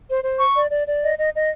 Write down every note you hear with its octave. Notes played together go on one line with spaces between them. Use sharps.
C5
C5
C#6
D5
D5
D5
D#5
D#5
D#5